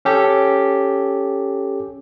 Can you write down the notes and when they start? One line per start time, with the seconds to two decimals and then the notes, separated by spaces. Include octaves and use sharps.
0.05 C#4 G4 A4